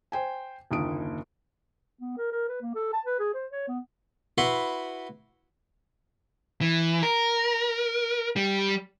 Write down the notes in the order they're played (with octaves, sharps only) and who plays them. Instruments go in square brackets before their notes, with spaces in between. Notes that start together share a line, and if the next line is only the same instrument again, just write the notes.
[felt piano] C5 G5 G#5
F#1 D#2 D3 F4 D#6 D7
[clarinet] B3
A#4
A#4
B4
A#3
A4
A5
B4
G#4
C5
C#5
B3
[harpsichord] E4 F#4 B4 F#5 C6
[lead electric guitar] E3
A#4
G3